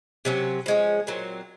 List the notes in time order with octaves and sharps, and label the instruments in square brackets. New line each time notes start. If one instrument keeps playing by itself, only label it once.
[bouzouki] C3 F#3 C#4
F3 G#3 C#4
A#2 F#3 C4